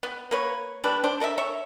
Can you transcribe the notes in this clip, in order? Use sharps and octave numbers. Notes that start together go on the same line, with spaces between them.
B3
A#3 B4 C#5
G3 A3 D4 B4
D4 C5
A4 A#4 D#5 E5
C#5 E5